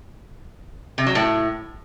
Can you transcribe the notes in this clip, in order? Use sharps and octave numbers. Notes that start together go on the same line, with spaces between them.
C3
F#3
A2